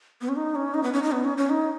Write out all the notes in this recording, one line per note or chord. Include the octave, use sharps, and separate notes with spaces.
B3
C#4
D#4
C#4
D#4
B3
C#4
D#4
B3
C#4
C#4
D#4